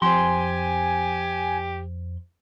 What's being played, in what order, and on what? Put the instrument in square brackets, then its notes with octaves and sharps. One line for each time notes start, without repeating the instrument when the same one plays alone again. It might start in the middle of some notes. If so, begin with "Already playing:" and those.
[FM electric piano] F2 [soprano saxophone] G4 [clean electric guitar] C5 C6 [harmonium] G#5